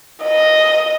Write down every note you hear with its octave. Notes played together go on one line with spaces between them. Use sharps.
D#5